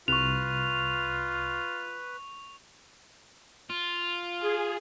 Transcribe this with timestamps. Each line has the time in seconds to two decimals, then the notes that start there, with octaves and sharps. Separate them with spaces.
0.08 C2 F4 B4 C#6 F7
3.70 F4
4.39 G#4